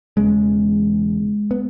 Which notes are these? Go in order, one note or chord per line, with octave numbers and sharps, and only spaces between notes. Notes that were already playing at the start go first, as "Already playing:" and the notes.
E1 E2 C#3 G#3
B3